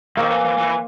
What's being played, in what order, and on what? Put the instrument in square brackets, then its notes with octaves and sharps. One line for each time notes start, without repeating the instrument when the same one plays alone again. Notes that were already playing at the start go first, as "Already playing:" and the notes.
[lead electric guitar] D#3 [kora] A#3 C4
[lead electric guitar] E3
E3
E3